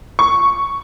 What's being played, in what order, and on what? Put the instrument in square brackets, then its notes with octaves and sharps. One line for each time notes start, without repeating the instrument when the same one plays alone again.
[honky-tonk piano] C#6